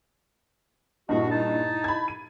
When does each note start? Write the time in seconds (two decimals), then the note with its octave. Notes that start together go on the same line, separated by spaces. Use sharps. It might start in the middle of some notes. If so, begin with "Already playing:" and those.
1.09 G2 A#2 E4 F#4 D#5
1.30 D#4 A5
1.84 B5 G#6
2.08 D#7